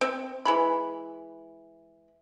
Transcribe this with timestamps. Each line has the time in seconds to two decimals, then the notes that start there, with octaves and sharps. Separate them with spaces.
0.01 C4
0.45 E3 G#3 B5